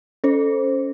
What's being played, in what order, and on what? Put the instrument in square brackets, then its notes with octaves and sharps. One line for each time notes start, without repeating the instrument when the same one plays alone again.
[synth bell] C#4 A4 C5